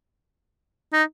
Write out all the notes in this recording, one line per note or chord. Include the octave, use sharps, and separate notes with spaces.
D#4